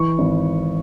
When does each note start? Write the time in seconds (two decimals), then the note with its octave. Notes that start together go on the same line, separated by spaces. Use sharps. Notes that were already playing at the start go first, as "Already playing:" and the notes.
Already playing: E3 C#6
0.19 G#1